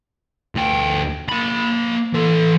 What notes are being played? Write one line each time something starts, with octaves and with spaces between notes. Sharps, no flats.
D2 G5
A#3 B5
E3 A4